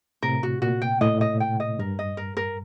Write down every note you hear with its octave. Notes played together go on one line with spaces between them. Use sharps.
A2 C3 A#4
F#4
A#2 F#4
G5
A2 D#5
D#5
G5
D#5
G2 A#4
D#5
A#4
A#4